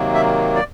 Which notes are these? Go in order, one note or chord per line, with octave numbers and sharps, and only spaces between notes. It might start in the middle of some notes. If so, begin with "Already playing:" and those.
Already playing: C3 D#3 F#3 A#3
E5
D5